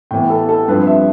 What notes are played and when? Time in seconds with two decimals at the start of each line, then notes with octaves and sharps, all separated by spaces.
0.11 A2 E3 B3 G5
0.30 A4
0.49 A4
0.68 G2 F3 C4 B4
0.87 E5